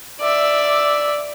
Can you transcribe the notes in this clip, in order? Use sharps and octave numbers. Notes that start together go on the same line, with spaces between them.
D5 E5